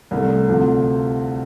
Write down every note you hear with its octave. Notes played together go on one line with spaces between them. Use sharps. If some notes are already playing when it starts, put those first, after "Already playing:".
C2 C3 A3
D2 C3 F3 A3